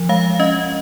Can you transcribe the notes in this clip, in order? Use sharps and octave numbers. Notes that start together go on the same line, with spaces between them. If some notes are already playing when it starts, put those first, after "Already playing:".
Already playing: F3
G#3 F5
C#4 D#5